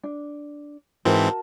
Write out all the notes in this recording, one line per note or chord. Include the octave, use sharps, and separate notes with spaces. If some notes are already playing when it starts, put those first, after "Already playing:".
D4
G#2 E3 C4 F#4 A#4 A5